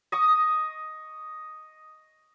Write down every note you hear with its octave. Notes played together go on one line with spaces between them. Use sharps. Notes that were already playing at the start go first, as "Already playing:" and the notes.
D#5 C#6 D#6